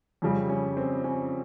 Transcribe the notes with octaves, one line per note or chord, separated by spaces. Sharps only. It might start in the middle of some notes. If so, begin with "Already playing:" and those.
F2 C#3 G3 C#4
C#4
C4
C#4